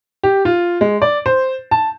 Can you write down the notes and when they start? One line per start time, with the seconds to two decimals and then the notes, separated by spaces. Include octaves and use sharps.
0.23 G4
0.45 F4
0.81 G#3
1.02 D5
1.26 C5
1.71 A5